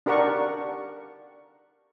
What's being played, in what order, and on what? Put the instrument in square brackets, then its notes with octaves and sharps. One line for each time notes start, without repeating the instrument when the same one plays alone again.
[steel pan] D4 G4 A#4 D5 F#5 C#6